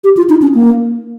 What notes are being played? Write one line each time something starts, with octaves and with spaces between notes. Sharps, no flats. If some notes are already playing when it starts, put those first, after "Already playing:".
G4
F4
D#4
C#4
A#3